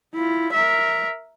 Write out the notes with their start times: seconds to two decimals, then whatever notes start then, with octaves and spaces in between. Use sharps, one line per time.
0.14 E4 F4
0.53 A#4 E5